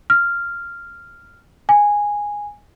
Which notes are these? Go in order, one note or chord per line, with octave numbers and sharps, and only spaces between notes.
F6
G#5